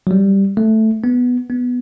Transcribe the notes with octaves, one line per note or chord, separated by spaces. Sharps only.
F#3
G3
A3
B3
B3